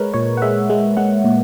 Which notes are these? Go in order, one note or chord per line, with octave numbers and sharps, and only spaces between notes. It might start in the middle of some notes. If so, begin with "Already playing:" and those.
Already playing: G#3 A#4 B4 C#5
A#2 C#5
F#5
G#3 E5
G#3
G#3 F#5
A#2